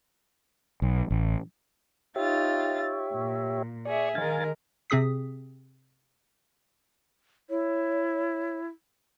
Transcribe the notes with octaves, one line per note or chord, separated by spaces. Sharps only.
B1
A1
D#4 F4 G4 C#5 E5 A6
A#2
G#4 D5 E5 C#6
D#3 G#3 A#4 F5 G#5 A6
C3 C4 G#4 D#6 B6
E4 C#5